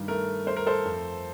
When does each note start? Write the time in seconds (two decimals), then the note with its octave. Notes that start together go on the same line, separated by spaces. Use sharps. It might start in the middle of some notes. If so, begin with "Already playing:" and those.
Already playing: G2 D#3
0.08 A3 A#4
0.46 A3 C5
0.56 A#4
0.67 A4 C5
0.86 F2